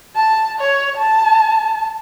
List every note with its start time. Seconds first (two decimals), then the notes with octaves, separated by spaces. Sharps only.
0.16 A5
0.60 C#5
0.97 A5